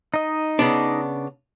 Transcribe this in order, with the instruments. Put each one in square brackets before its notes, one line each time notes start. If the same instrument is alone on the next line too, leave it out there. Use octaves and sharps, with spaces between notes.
[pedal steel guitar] D#4 D#5
[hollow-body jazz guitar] C#3 B3 D4